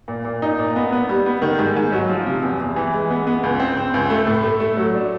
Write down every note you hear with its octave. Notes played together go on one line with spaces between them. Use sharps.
A#2
A#2
D#4
A#2
B3
B3
G3
B3
D#3
G#2
G#2
F#3
F3
C3
E2
E2
E3
G#3
B3
B3
C#2
C4
C4
C#2
A3
A2
A3
A3
F#3
D4